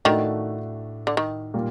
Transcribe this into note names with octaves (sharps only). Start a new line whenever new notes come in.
A2 D#3 A3 D4 F#4
D3
D#3
A#2 G3 A#3